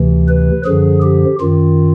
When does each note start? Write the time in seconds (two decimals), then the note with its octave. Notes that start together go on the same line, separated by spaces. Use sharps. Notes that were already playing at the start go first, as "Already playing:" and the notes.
Already playing: D2 C3 E3
0.29 B4
0.65 F#2 D3 F3 G#4
1.03 G4
1.41 F#2 D#3 F4